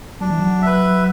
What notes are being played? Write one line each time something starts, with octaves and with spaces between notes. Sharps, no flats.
F#3 D4
E3
F#3
B4 E5